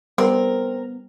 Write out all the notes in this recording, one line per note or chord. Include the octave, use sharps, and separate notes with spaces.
G3 B3 C4 A#4